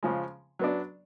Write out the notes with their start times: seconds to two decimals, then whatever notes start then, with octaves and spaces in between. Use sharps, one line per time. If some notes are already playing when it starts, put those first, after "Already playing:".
0.03 C#3 F3 G#3
0.59 F#3 B3 D4